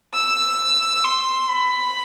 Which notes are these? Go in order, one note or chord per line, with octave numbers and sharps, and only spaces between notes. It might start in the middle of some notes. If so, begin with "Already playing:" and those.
E6
C6
B5